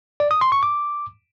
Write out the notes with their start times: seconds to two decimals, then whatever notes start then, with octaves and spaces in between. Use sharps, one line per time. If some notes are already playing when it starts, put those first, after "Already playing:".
0.20 D5
0.31 D#6
0.41 C6
0.52 C#6
0.63 D6